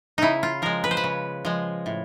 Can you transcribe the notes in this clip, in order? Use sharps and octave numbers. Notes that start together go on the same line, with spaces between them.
C#3 D#4 E4
F4
F3 G#3 A#4
B4
C5
B4
C#3
F3 G#3
A2